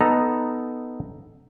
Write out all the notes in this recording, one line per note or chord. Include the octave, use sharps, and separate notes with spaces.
B3 D#4 A4 A#5